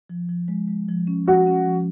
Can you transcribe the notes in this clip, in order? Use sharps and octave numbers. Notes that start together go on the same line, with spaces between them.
F3
F3
G#3
G#3
F3
C#4
F3 F#4
C#4
F3